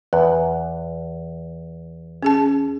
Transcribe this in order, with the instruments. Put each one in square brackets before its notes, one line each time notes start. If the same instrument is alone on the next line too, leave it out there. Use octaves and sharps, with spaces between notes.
[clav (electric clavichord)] E2 [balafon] B4
[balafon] C#4 G#4 A5